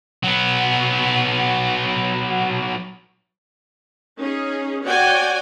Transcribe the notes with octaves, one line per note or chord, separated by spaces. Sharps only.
F#3 B3
C#4 D#4 G#4
F#4 C#5 D5 G5 G#5